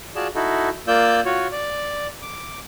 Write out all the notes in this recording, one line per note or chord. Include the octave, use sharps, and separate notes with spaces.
F4 F#4 G#4 D5 A5
D#4 E4 F#4 A4
A#3 F4 D5 E6 G6
F4 F#4 C#5
D5
D6